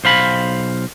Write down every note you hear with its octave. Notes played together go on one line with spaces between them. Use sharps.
B1 C5 F5 B5